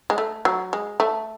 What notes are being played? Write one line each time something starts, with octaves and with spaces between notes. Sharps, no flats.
G#3
A3
F#3
G#3
A3